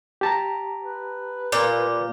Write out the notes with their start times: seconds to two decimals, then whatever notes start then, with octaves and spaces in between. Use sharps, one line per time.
0.21 G4 A5 A#5
0.83 B4
1.52 A#2 D5 D6